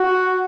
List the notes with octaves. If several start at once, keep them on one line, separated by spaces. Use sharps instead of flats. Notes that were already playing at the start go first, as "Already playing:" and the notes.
Already playing: F#4